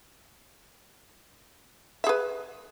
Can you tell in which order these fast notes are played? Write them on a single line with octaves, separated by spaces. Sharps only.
E5 G#4 B4